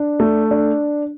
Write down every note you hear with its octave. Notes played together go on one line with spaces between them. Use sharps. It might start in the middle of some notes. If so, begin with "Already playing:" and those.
Already playing: D4
A3
D4